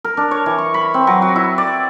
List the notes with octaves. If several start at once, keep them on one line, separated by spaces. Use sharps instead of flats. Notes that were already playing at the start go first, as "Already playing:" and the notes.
A#4
D4
C#5
E3
C#6
B5
C4
F#3
F#4
E4
D5